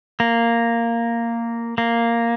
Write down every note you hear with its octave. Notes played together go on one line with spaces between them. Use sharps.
A#3
A#3